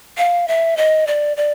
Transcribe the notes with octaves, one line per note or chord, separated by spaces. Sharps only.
F5
E5
D#5
D5
D5